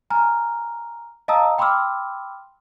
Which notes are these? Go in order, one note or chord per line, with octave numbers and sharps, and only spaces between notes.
G#5 A#5 F6
D#5 F5 A5 A#5 D#6 E6
G5 B5 C6 D6 E6 F6